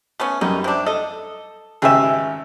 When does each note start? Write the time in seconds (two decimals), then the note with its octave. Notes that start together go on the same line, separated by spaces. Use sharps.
0.20 A3 B3 C#4
0.41 F#2 G3 B3 D#4
0.64 C3 D4
0.86 A4 D#5
1.82 G#1 C#3 G4 G#4 B4 E5